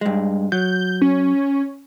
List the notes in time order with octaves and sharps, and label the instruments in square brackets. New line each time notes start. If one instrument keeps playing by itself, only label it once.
[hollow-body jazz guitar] G2 G#3
[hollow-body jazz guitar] F#3 [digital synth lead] G6
[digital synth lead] C#4